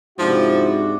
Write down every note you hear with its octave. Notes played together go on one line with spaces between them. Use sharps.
G#2 C3 F3 D4 E4 F#4 C5